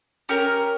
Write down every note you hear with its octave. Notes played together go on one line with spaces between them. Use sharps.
C#4 G4 A#4